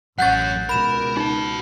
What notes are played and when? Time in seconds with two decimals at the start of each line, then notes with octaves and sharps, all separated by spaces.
0.18 A1 F#2 C#4 F#5 C#6 F#6 G6 A6
0.69 C#2 B2 A#4 B5 E7
1.17 D#4 F#4 A5